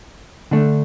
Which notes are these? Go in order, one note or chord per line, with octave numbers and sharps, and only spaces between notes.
D3 A3 D4